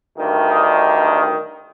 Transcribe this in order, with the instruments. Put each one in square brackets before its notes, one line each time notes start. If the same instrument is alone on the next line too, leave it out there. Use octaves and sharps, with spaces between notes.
[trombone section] D2 G2 D#3